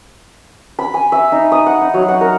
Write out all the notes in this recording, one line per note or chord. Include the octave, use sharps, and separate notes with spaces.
B5
G#5
E5
D#4
D#6
F#5
D#4
F#3
F#5
A#4